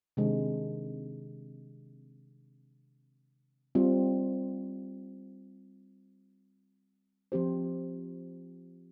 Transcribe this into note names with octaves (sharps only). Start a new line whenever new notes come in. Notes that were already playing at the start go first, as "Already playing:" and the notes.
C3 D#3 G#3 D4
G3 C4 F4
F3 C4 G4 C5